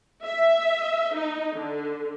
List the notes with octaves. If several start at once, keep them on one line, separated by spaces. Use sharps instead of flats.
E5
D#4
D3